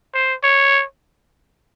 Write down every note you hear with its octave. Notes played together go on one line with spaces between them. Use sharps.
C5
C#5